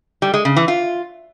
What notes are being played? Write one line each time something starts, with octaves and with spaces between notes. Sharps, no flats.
G3
G#3
C#3
E3
F4